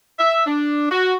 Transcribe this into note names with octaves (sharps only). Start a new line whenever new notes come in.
E5
D4
F#4